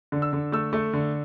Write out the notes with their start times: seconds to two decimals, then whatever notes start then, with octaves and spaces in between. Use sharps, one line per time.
0.12 D3
0.22 E6
0.33 D3
0.52 A3 E6
0.73 A3
0.93 D3